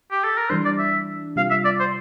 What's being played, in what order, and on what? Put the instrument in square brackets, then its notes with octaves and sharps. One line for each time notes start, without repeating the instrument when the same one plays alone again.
[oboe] G4
A4
A#4
[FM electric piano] E3 G3 D4 [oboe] C5
[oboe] D5
E5
[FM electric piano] C3 G3 C4 F4 [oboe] F5
[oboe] E5
D5
C5